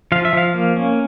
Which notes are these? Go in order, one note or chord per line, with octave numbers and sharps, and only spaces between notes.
F3 F5
E5
F3 F5
A#3
C#4